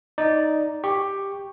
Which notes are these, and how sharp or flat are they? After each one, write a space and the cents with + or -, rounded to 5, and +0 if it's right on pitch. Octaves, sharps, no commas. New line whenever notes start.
D#4 +0 D5 +0
G4 +10 C#6 +0